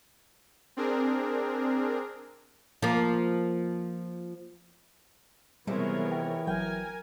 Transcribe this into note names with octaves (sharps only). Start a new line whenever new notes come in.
C4 D4 G#4 A#4
F3 A#3
C3 E3 F3 G3 G#3 B3 A#4 C#5
G5
G1 F#3 A#4 G5 G#5